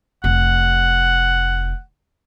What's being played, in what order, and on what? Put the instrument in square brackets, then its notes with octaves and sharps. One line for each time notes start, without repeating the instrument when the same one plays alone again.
[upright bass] F1 [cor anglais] F#5